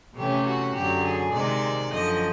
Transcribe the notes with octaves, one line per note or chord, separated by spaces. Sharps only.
C3 E3 A3 C#4 G4
F#4
F#2 D3 F#3 G4
G#4
C3 D#3 G#3 C4 D5
F#2 D3 F3 D#5